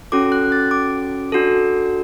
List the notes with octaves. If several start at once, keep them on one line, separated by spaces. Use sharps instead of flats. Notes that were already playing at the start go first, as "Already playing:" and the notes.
C#4 F#4 A4 D6
F#6
A6
D6
D4 F#4 A4